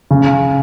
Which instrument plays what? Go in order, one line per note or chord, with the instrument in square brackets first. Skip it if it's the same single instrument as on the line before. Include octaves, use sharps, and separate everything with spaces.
[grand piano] C#3